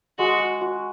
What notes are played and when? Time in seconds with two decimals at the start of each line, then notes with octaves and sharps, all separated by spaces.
0.19 G#3 F#4
0.40 G#3
0.61 F#4